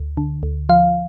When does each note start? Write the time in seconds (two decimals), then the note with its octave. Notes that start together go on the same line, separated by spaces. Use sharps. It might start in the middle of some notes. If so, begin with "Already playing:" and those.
Already playing: D2
0.17 D3
0.43 D2
0.69 F3 F5